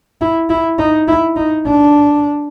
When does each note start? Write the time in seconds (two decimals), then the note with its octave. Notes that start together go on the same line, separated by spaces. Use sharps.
0.21 E4
0.50 E4
0.79 D#4
1.08 E4
1.36 D#4
1.65 D4